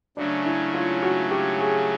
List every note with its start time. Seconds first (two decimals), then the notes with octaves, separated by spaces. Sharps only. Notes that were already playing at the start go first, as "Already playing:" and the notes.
0.17 C#3 F#3 A3 C#4 D4
0.46 E4
0.74 F4
1.03 F#4
1.31 G4
1.59 G#4